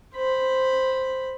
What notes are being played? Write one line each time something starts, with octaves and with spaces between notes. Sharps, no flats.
C5 B5